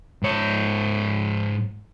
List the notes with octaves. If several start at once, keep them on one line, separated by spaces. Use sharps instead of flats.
G#2 C#5